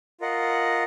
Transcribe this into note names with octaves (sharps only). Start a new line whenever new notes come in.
F4 A#4 D#5 F#5